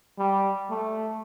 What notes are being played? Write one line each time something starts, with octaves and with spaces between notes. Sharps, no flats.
G3
A3